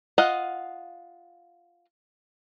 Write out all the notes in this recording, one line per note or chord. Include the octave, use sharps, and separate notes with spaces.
F4 D#5 F5 F#5